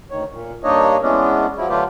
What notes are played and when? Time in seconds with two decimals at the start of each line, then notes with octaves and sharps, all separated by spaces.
0.10 D2 D#3 C#5
0.32 A#2
0.64 G2 A#3 D4 D#4 C#5 D#5
1.02 E3 G#3 B3 C#4 D4
1.57 F3 F#3 E4
1.69 D3 F#3 A3 F4 G4 B4